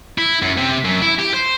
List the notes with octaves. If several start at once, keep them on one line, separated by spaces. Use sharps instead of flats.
E4
F#2
C3
F#2
E4
G4
C5